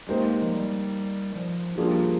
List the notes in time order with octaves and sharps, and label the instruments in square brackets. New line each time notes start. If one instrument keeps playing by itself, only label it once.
[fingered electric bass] G#3 [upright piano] A#3 D#4 G4 C5 D#5
[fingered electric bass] F3
G3
F3
[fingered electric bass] F3 [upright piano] G3 A#3 D4 F4 G#4